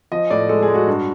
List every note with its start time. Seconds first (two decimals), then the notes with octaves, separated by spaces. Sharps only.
0.12 F3 D#5
0.30 A2 D5
0.49 G#3 A4
0.62 G#4
0.68 G#3
0.74 F#4
0.87 G2